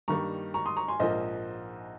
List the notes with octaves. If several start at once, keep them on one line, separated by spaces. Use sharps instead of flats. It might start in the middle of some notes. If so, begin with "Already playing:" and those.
G2 D#3 G3 A#3 A#5 C#6
A#5 C#6
C6 D#6
A#5 C#6
G#5 C6
A#1 G#2 F3 A#3 C5 D#5